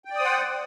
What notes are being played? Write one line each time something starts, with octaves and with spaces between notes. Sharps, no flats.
C5 D5 F#5 G5 D#6